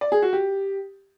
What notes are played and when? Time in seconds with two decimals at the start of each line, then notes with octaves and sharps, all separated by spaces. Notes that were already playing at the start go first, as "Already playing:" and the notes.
0.01 D5
0.12 G#4
0.22 F#4
0.33 G4